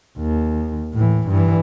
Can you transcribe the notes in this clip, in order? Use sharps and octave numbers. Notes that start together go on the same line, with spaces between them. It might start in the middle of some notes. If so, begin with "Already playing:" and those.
D#2
A2 E3
G2 E3